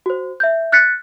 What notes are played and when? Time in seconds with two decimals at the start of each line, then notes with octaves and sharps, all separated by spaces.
0.06 F#4 C5
0.40 E5 G6
0.72 F6 F#6 A6 B6 C#7